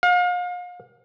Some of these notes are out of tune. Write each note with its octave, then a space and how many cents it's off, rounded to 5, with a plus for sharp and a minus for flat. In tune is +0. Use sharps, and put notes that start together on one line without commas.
F5 +40